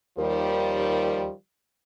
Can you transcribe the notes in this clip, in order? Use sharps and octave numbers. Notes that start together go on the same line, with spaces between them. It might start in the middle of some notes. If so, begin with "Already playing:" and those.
D#2 D#3 F3 G3